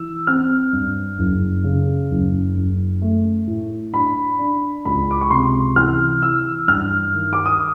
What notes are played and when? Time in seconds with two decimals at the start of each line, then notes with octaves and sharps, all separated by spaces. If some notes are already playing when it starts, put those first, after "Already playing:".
Already playing: E3 E6
0.27 C4 F6
0.73 G2
1.19 F#1
1.64 C#3
2.11 F#1
2.56 F#1
3.02 A3
3.47 A2
3.94 D4 B5
4.39 D4
4.85 C#2 B5
5.11 D6
5.21 C#6
5.30 C3 C6
5.76 E3 F6
6.22 E3 E6
6.67 G2 F6
7.14 D#3
7.33 D6
7.46 D#6